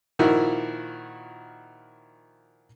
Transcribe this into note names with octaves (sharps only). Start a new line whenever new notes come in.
A#2 D#3 F3 E4 F#4